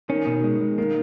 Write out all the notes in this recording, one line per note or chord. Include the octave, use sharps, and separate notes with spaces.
D#3 C#4
B2
G#3
G#3
D#3 A#3